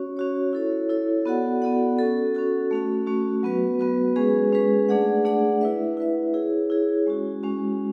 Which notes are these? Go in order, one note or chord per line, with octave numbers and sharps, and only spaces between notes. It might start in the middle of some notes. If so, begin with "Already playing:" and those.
Already playing: C#4 F#4 C#5
C#4 F#4 C#5
E4 A4 C#5
E4 A4 C#5
B3 F#4 A4 D5 F#5
B3 F#4 A4 D5 F#5
C#4 F#4 A4
C#4 F#4 A4
A3 C#4 F#4
A3 C#4 F#4
F#3 B3 F#4 B4
F#3 B3 F#4 B4
G#3 C#4 G#4 B4
G#3 C#4 G#4 B4
A3 D4 G#4 D5 F#5
A3 D4 G#4 D5 F#5
E4 B4 E5
E4 B4 E5
E4 G#4 C#5
E4 G#4 C#5
G#3 C#4 F#4
G#3 C#4 F#4